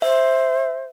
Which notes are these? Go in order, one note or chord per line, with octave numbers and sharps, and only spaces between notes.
C5 E5